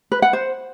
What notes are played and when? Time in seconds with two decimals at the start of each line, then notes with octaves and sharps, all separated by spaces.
0.12 B4
0.22 F#5
0.33 C5